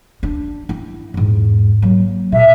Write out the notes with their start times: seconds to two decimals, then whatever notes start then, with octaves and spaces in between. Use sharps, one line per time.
0.23 D4
0.69 E4
1.14 E2 G#2
1.82 F#3 A#3
2.32 B2 E5